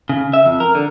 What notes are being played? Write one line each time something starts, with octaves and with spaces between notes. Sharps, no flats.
C#3
E5
F2
A#4
D3